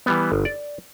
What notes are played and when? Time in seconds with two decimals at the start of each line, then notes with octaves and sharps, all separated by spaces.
0.06 E3 G3 B3
0.32 G1
0.45 D5